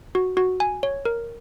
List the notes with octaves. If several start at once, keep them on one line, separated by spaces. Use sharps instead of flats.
F#4
F#4
G#5
C#5
A#4